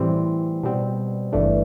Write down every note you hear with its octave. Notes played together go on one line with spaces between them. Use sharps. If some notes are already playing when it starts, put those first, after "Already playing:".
Already playing: A2 E3 G3 C4
B2 G3 C4
G1 G2 E3 A3 D4